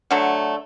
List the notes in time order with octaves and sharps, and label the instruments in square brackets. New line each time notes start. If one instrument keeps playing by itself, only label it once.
[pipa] D3 F#3 A3